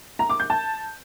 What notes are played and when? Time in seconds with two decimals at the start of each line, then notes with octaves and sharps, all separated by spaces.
0.19 A#5
0.29 D6
0.40 G6
0.50 A5